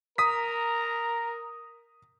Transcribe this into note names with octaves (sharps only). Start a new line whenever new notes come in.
A#4 A#5 D#6 B6